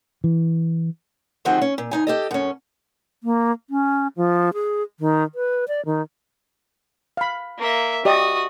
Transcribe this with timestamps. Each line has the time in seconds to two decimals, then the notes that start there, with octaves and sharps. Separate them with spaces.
0.24 E3
1.45 D2 D#3 F3 C4 F#4 G#4
1.61 C#4
1.78 A#2
1.91 D2 D#4 G#5
2.07 G4 A4 D#5
2.31 F#2 C#4
3.23 A#3
3.70 C#4
4.17 F3
4.54 G#4
5.00 D#3
5.35 B4
5.68 D5
5.85 D#3
7.17 F5 B5
7.58 A#3 E5
8.05 F#4 G4 D5 D#5 D#6